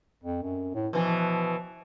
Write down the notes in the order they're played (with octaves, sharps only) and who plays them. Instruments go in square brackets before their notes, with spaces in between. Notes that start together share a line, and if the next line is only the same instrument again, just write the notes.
[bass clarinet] F2
F#2
A2
[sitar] B2 E3 [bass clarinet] F3